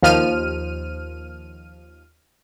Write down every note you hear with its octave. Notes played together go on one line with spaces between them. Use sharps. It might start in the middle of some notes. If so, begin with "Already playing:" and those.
D#2 F3 F6 D#7